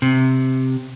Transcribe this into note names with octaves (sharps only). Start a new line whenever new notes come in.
C3